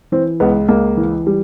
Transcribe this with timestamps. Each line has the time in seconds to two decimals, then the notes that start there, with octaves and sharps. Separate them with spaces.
0.12 E3 C4
0.40 C#2 B3
0.69 C#2 A#3
0.97 E3
1.27 G3